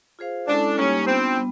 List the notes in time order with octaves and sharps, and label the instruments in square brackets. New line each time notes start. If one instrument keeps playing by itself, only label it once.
[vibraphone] F4 G#4 C5 F5
[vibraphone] G#3 C#4 E4 A4 [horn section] D4
[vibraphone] G3 A#3 D#4 G4 [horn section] C#4
[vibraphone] B3 D4 F4 [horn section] C4
[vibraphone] G3 B3